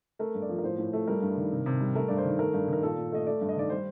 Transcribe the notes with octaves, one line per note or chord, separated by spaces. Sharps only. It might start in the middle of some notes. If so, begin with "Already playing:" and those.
A3 A#4
G2
D5
F3
A#4
A2 C5
A2
A3
G3 A#4
G2
D#3
C3
C3
G3
A3 A#4
G2 D5
C5
D#3
A3 A#4
G2
D#3 A#4
A#2 A4
A#2
A3 D#5
A3 D5
G2
D#5
D#3 D5
G3 C5